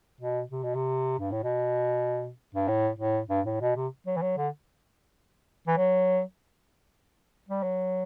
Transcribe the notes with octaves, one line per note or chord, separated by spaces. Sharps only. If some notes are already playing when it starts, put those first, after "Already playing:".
B2
C3
B2
C3
G2
A2
B2
G2
A2
A2
G2
A2
B2
C3
F#3
E3
F#3
D3
E3
F#3
G3
F#3